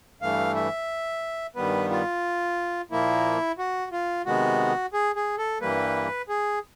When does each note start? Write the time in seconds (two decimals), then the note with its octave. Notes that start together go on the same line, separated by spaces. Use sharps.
0.21 G2 E3 A3 F5
0.56 E5
1.56 G2 D#3 G3 B3 B4
1.91 F4
2.91 A#2 F3 A#3 E4
3.58 F#4
3.92 F4
4.26 C3 D#3 G#3 B3 F#4
4.93 G#4
5.16 G#4
5.38 A4
5.61 G2 E3 G3 A#3 B4
6.29 G#4